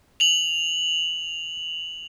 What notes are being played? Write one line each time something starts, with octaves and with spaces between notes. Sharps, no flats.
F7 F#7